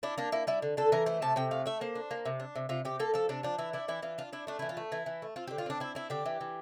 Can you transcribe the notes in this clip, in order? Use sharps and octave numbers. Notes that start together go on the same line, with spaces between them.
D4 E4
A#3 D4
A#3 E4
G3 E4
D3
D3 A4
E3 A#4
A3 C5
C3 A5
C3 G5
A3 F5
A3 E5
A#3 C5
D4
A#3
C3
D4
C3
C3 F4
C3 G4
A#3 A4
F3 A4
C3 D4
F3 D4
E3 E4
D4 E4
E3 E4
E3 F4
D4 F4
D4 E4
A3 D4
E4
E3
F4
A3
E3 E4
E3
A3
C4 F4
G4
D3
F4
C4 D4
C4 E4
C4 E4
D3 G4
E3
E3